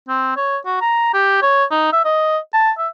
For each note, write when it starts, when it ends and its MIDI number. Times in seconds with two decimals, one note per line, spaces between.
0.08 0.33 60
0.36 0.57 73
0.65 0.80 66
0.81 1.09 82
1.13 1.40 67
1.42 1.64 73
1.71 1.92 63
1.93 2.01 76
2.05 2.38 75
2.53 2.71 81
2.78 2.88 76